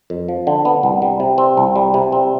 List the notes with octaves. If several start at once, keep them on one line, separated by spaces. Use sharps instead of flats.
F2
F3
D3
B3
C2
G3
C3
C4
C2
G3
C3
C4